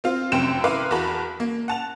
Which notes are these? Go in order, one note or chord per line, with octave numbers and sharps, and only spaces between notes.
C4 F4
F1 F#2 C3 G5 E7
E4 A#4 B4 F5 C6 D6
E2 F#4 A#4 A5 B5
A#3
F#5 A5 F7